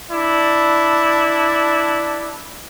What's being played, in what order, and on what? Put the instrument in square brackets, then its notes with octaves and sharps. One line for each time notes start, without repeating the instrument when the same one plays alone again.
[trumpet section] D4 E4 D5